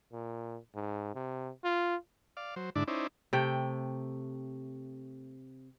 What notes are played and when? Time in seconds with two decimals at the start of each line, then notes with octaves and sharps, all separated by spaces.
0.13 A#2
0.75 G#2
1.15 C3
1.64 F4
2.37 D5 F5
2.56 F#3 C5
2.76 G#2 D3 D4 E4 D5
2.88 C#4 D#4 E4 C5 D5
3.33 C3 A3 G5